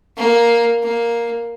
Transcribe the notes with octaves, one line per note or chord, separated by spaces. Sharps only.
A#3
A#3